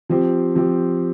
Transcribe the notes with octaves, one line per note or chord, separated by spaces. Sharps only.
F3 C4 G4
F3 C4 G4